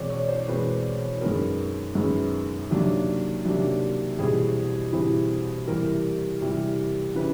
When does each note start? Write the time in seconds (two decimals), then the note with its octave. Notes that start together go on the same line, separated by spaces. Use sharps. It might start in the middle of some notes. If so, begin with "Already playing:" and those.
Already playing: E2 B2 G#3 C4 C#5 D5
0.10 C#5
0.28 C5
0.48 E2 B2 G#3 C4 B4
1.21 F#2 D#3 G#3 B3 A#4
1.95 F#2 D#3 G#3 B3
2.71 C3 D#3 F#3 A#3 D4
3.45 C3 D#3 F#3 A#3 D4
4.18 E2 B2 G3 C4 E4 G#4
4.92 E2 B2 G3 C4 E4
5.68 E2 C3 E3 G3 A#4
6.41 E2 C3 E3 G3
7.15 C#3 E3 B4